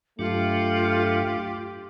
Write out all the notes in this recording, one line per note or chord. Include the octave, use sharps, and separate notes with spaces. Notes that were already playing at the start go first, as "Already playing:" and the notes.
G2 F#3 A3 D4 F4 G4